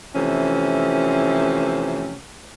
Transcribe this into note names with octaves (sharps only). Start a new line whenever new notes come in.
C3 E3 F3 A3 C#4